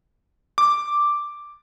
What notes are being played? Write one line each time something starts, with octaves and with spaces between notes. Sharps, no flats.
D6